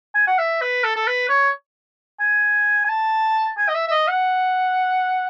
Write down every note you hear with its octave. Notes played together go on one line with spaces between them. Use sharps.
G#5
F#5
E5
B4
A4
A4
B4
C#5
G#5
G#5
A5
G#5
D#5
E5
E5
D#5
F#5